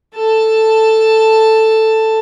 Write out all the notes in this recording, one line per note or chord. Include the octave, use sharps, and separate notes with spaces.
A4 A5